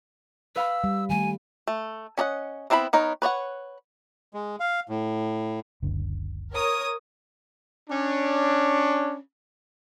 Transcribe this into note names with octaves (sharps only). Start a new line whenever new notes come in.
B4 F5 B5 E6
G3
D#3 G3 A3 G#5
A3
C#4 D4 D#5 F#5
B3 C4 E4 C5 B5
B3 D#4 A#4 C#5
B4 C#5 D5 F#5
G#3
F5
A2
F#1 C#2 D3
A#4 C#5 D#6
C#4 D4